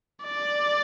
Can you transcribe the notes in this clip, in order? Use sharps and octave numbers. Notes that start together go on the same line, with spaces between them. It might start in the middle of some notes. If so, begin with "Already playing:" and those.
D5